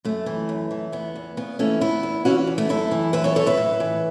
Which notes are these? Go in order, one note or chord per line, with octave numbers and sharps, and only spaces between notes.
F#2 A3
E3
F#2
E3
E2 B3
E2
C#3 B3
E3 A3 C#4
E2 B3 E4
E2
E3 C#4 F#4
E2
A3
F#2 E4 A4
E3
F#2 B4 E5
A4 C#5
F#2 A4 C#5
B4 E5
A2
E3